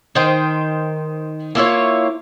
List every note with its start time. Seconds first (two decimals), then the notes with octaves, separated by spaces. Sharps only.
0.15 D#3 C5 G5
1.55 A#3 E4 F4 C#5